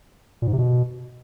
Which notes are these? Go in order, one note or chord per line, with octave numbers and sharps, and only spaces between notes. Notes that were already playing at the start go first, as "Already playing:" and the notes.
A#2
G#2
C3
B2